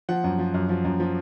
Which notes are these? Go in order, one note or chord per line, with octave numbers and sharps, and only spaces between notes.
F3 F#5
F#2
F3
F#2
F3
F#2
F3